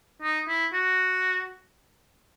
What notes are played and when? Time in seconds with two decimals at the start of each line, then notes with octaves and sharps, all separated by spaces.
0.22 D#4
0.48 E4
0.73 F#4